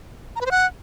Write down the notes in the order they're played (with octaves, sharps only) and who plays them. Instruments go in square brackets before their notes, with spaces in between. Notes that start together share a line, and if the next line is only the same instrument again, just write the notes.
[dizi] A#5
B4
C5
F#5